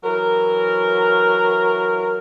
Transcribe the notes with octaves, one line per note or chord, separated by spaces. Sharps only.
E3 F#3 A#4